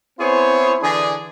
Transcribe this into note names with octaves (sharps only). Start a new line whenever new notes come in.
B3 C4 E4 G#4 C5 C#5
D3 E3 D4 G#4